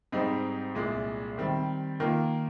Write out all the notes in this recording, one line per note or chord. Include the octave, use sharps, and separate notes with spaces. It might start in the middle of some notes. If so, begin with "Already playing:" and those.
G#2 G3 C4 D#4
C2 A#2 G#3
D#3 G3 C4
D#3 A#3 F4